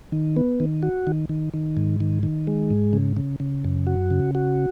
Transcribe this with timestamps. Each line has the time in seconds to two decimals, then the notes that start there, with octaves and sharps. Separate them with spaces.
0.12 D#3
0.37 B3
0.60 D#3
0.83 F#4
1.07 D#3
1.29 D#3
1.54 D#3
1.77 G#2
2.00 D#3
2.23 D#3
2.47 G#3
2.71 G#2
2.93 C#3
3.17 C#3
3.40 C#3
3.64 F#2
3.87 F#4
4.10 C#3
4.35 F#4